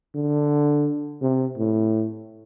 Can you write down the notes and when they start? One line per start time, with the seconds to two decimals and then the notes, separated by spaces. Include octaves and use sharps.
0.15 D3
1.22 C3
1.57 A2